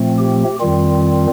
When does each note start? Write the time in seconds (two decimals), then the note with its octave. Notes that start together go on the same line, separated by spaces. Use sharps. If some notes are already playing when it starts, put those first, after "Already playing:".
Already playing: A#2 F3 A3 C4
0.19 G4
0.60 F2 D#3 G3 C4 F4